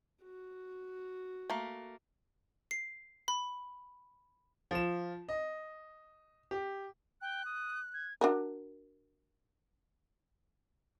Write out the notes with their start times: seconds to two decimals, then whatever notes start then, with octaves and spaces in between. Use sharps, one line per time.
0.23 F#4
1.50 A3 A#3
2.71 C7
3.28 B5
4.71 F3 E7
5.29 D#5
6.51 G4
7.22 G5 F#6
7.45 D#6
7.94 G#6
8.21 D4 F#4 A#4